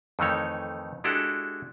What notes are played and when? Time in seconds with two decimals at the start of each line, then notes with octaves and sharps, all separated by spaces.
0.19 F2 D#3 E3 A3 D#4 C#5
1.04 G#3 D4 E4 F#4 G4 A4